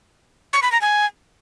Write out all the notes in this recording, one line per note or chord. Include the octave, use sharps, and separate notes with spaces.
C#6
B5
A#5
G#5